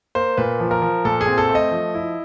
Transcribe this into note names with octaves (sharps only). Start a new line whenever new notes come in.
A#3 C5
A#2 B4
F3
A#4
F3
A#2 A4
G#4
C4
A4
A3
D#5
F3
E4